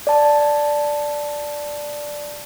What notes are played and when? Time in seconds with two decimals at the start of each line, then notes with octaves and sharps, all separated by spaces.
0.07 D5 A5